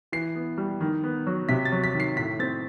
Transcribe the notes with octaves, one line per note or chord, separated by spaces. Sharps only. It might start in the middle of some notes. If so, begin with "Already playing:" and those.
E3 C7
B3
G3
D#3
B3
F#3
C3 B6
A6
F#3
B6
D#3
C7
A2 B6
C4 A6